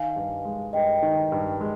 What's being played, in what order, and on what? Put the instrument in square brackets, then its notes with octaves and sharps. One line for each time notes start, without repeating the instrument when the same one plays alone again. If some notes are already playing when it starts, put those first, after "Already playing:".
Already playing: [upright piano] D#3 [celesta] F5 G#5
[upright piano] G2
G#3
[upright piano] G2 [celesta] D#5 G5
[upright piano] D#3
G2
G#3